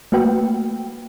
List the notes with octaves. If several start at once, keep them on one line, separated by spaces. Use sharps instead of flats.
A3 A#3 F#4 B4 G5